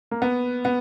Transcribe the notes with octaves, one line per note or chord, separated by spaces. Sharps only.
A#3
B3
B3